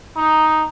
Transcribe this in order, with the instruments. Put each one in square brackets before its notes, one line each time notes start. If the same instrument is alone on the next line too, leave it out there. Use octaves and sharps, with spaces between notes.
[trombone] D#4